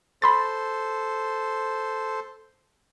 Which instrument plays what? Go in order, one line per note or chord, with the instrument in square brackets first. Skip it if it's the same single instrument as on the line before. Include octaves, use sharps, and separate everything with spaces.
[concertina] A4 C5 [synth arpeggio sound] B5 C6 A6